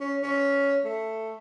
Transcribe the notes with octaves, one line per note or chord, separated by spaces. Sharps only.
C#4
C#4
A3